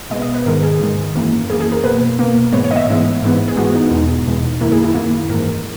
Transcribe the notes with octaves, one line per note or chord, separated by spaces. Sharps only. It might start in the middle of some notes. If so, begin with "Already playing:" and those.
B2 G#3 B3 D#5
D#5
B4
G#2 D#3 G#3 A#4
G#4
G#2 D#3 G#3
F#2 E3 A#3
F#2 E3 A#3 G#4
G#4
A#4
B2 A#3 B4
B2 A#3
G#2 E3 G#3 B3 C#5
C#5
D#5
E5
G#2 E3 G#3 B3
G#2 E3 G#3 B3
G#4
G#2 E3 G#3 B3 F#4
D#4
E2 B2 G#3 D#4
E2 B2 G#3
F#2 D#3 A#3 E4
G#4
E4
F#2 D#3 A#3 E4
G#2 E3 G#3 A#4